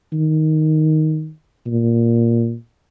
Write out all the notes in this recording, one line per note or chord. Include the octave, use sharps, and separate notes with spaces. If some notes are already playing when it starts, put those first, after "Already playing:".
D#3
A#2